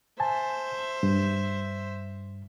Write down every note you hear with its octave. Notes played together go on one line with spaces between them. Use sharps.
C5 E5 G#5 A5
G2